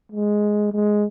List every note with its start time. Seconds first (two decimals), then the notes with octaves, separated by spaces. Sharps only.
0.12 G#3
0.73 G#3